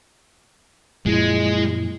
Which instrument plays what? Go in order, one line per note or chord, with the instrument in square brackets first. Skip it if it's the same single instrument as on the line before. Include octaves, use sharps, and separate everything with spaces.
[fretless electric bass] F#2 A#2 F3 [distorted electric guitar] G#3 [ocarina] E4